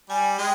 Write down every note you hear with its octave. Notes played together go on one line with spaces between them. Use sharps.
G3 G#5
G#3 G5